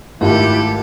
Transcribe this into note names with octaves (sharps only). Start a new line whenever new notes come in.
G#1 A3 E4 F4 G4 A4